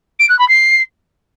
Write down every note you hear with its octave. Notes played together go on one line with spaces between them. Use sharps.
D7
F#6
B5
C7